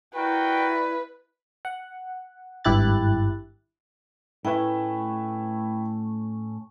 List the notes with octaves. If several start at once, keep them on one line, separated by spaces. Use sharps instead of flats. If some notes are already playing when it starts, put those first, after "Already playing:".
E4 F#4 A#4 B4 D5 G5
F#5
G#1 G2 E4 G4 F#6 A6
A2 A3 C#4 E4 B4 E5 G5